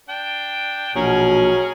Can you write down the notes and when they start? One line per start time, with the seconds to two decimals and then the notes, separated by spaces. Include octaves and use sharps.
0.09 D4 G5
0.96 A#1 B2 F#3 C#4 G#4 A#4